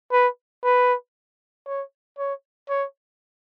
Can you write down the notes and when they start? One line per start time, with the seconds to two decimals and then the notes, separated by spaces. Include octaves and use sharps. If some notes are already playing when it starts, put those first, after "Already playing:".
0.12 B4
0.64 B4
1.67 C#5
2.18 C#5
2.69 C#5